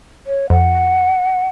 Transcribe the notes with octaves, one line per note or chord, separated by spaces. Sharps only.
C#5
F2 F#5